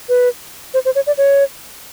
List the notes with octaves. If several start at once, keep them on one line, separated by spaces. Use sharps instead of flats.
B4
C5
C5
C#5
D5
C#5